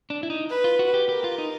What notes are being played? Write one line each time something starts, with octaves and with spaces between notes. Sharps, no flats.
D4
E4
D#4
B4
F4
F#4
G4
G4 A#4
F4
D#4